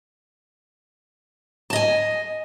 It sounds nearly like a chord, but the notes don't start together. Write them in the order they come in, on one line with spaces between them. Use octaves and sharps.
A5 D#5 G#5